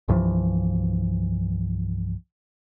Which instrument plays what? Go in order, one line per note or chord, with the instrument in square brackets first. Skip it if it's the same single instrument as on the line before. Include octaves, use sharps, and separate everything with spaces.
[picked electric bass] C2 G2 E3 F3